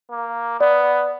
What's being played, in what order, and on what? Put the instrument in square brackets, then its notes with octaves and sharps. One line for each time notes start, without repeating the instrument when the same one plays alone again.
[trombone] A#3
[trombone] B3 [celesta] D5